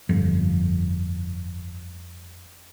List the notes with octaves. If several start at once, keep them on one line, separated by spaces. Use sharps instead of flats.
G1 F2